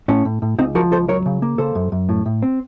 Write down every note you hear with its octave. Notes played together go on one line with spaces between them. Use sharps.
A2 C#4
A2
A2
C#2 C4 D#4
F3 F#4 A#4
C#2 A4 C5
F#3 A#4 C#5
C#3
A#3
C#3 A4 C5
F#2
F#2
A2
A2
C4